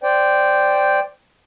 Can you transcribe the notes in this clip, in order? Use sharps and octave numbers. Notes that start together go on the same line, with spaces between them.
C5 D5 G5